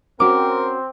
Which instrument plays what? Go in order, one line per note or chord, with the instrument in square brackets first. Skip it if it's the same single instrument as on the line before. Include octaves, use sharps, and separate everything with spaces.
[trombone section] C4 [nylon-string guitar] C#4 F#4 [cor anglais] A#4 [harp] D6